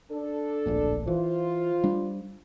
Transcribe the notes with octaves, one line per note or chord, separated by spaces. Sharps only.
D4 A4
D1 A#1 A#2
E3 F4 C5
G3 D4